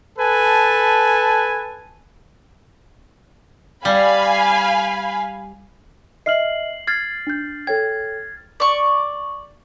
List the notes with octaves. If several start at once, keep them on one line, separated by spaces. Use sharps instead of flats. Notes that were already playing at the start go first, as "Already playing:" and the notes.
A4 B4 G#5 A5
G3 F5 G#5 B5
D#5 E5 F6 C7 F#7
F6 G#6 A6 C7
D4 G6
A4 C#5 G5 G#6
D5 C#6